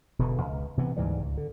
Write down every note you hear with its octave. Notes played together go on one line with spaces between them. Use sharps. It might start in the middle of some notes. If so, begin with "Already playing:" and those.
E1 B2 D3 E3
C#2
C3 E3 B3
D2 G#2 E3 G3
C#2
D3